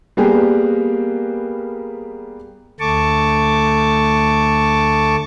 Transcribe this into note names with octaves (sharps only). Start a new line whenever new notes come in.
G3 A#3 B3 G4 G#4 A#4
D2 A3 A5 C#6 D6